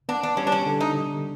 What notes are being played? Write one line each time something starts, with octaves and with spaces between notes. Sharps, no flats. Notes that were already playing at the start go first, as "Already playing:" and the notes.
B3 D4
D4
G3 C#4
D4
C#4
D3
D#4